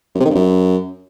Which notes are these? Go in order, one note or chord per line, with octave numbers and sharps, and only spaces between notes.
F#2
C3
D#3
G2
F#2